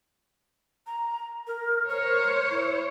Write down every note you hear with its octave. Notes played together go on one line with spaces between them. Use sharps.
A#5
A#4
A#4 C5 C#5
E4